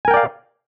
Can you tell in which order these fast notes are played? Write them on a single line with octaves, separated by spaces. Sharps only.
G#5 A#4 G5 D5 F5